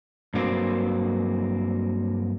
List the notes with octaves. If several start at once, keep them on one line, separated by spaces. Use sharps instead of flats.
G2 F#3 A#3 C4